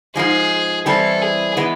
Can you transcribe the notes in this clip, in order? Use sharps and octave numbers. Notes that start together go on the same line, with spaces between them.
G#2 F3 G#3 G#4
E3 G3 C4 E4 A4
G#4
E3 G#3 B3